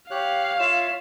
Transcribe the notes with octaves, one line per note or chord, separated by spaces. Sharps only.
G4 C#5 F5 F#6
F4 C#5 E5 E7